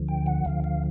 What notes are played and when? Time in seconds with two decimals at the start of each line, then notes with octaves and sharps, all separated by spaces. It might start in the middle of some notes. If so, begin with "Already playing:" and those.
Already playing: D2 D3 F3
0.08 G5
0.26 F#5
0.45 D2 D3 F3 F5
0.64 F5